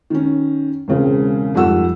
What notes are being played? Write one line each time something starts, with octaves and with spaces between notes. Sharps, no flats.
D#3 C#4
E1 C#2 C#3 C4
F2 G#2 G3 A4 F#5 E6